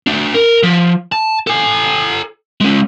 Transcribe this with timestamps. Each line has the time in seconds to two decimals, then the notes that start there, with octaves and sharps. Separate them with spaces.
0.07 A3 D4
0.34 A#4
0.63 F3
1.12 A5
1.47 A4 G#5
2.61 G#3 C#4